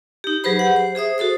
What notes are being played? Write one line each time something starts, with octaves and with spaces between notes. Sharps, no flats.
D#4 G4
F#3 G4 G#4 B4 C5 B5
G4 F#5
C5
G#4 C5 E5 D#6
F#4 A4 C5 D#6